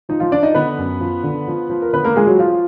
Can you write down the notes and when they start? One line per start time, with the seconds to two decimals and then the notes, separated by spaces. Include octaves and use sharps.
0.09 F3 D#4
0.20 F3 F4
0.32 F3 D4 D5
0.43 D#4 D#5
0.55 D3 B3 B4
0.78 F#2
1.01 F3
1.24 D3
1.48 F3
1.69 F3
1.82 A#4
1.93 D3 B3 B4
2.04 A#3 A#4
2.16 F3 G#3 G#4
2.27 F#3 F#4
2.39 F3 F4